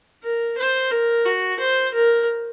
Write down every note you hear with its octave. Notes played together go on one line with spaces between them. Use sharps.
A#4
C5
A#4
F#4
C5
A#4